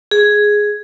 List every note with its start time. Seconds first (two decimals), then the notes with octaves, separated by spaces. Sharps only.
0.11 G#4